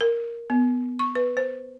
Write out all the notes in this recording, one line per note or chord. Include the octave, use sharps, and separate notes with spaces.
A#4
B3
C#6
B4
C5